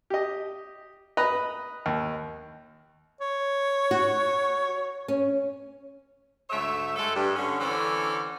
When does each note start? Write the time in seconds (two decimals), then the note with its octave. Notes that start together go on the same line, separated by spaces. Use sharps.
0.10 G4 D#5
1.17 B4 D#5 A#5 B5
1.86 D#2
3.20 C#5
3.91 F#4
5.08 C#4
6.50 D2 G#2 A3 C#5 E5
6.96 G2 G#3 A3 A4
7.15 G2
7.36 D3 C#4
7.59 D3 E3 C4 C#4 A4 D5